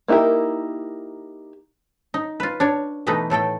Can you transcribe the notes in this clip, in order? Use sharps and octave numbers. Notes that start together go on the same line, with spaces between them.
A#3 D#4 E4 G4 A#4
D#4
F4 B4
D4 C#5
B2 E3 A3 D#4 B4 A#5
A2 A3 A4 G5